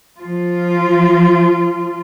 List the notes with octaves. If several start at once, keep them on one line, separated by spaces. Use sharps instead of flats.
F3 F4